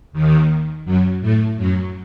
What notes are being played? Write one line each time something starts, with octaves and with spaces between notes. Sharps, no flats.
D#2 D#3
F#2 F#3
A2 A3
F#2 F#3